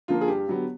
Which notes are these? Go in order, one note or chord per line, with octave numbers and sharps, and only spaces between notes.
D3 F3 A#3 F4
G#4
G2 G4
D3 F#3 B3